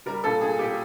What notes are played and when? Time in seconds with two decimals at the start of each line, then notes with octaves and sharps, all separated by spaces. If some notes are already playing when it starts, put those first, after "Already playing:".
0.06 G3 A#4
0.24 A#2 A4
0.41 A#2 G#4
0.59 A#2 G4